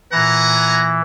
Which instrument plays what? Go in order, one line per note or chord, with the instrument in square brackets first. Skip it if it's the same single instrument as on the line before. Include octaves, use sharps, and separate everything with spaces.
[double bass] A#2 [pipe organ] E3 [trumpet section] F#5 G#5 A#5